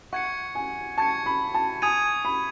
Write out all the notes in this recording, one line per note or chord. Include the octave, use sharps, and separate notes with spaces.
F#5 C#6 G#6 C#7
G#5
A5 C#6 G#6 C#7
B5
A5
G#5 D#6 G#6 D#7
B5